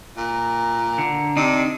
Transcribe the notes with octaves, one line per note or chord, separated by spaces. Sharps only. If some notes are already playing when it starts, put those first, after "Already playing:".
A#2 A#5
D3
C3 D4 D#4